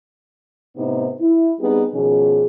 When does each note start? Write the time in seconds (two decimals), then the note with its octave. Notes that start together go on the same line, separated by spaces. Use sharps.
0.76 A2 C3 B3 D#4
1.20 E4
1.59 G3 B3 C4 D#4 G4 G#4
1.93 B2 D#3 F3 C#4 G#4